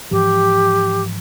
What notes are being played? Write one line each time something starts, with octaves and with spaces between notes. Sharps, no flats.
G#2 E3 F3 G4